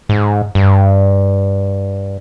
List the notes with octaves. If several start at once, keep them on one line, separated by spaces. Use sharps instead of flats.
G#2
G2